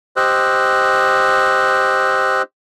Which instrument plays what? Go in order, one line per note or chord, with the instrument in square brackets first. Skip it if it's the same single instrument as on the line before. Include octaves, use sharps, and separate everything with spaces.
[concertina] G4 C5 D#5 E6 F#6